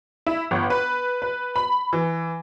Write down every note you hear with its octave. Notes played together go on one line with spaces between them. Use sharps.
E4
G1
B4
B4
B5
E3